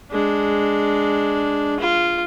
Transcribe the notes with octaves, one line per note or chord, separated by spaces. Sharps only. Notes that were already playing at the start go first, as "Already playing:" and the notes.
G#3 D4
F4